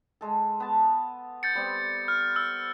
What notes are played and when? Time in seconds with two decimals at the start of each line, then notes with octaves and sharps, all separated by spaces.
0.21 G#3 A4
0.60 B3 A5
1.43 G6 A6 C#7
1.55 G3 B3 C4
2.08 F6
2.36 E6